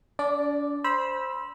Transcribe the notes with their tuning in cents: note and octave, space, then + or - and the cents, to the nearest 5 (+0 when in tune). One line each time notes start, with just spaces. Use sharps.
D4 -40 D5 +0
C5 +0 B5 -25 E6 +0